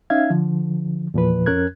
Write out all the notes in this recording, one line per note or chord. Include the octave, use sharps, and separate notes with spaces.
C#4 D#4 E5 F5 G#6
D3 F3
E2 A#2 F3 B4
F2 C#4 A#4 F#6 G#6